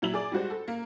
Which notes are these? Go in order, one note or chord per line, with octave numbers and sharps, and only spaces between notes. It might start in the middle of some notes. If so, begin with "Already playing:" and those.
A#2 F#3 E4 E5 F#7
G#4 D5 D6
G3 G#3 F#4 C5
A4
A#3